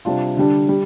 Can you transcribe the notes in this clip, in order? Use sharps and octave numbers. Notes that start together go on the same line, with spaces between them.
C3 G3 D4 F4
D3 G3 D4
G3